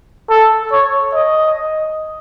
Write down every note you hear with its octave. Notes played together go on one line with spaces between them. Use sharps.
A4
C#5
D#5